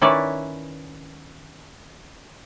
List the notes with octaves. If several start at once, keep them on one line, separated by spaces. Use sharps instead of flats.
D#3 C#4 E4 B4 C#5 D5